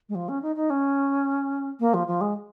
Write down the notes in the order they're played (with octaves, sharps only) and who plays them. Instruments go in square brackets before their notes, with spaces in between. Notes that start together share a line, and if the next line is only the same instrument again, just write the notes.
[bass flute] G#3
F3
C#4
D#4
D#4
C#4
A#3
F3
F3
G#3